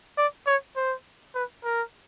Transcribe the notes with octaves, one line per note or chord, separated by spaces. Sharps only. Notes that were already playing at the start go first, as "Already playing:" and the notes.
D5
C#5
C5
B4
A#4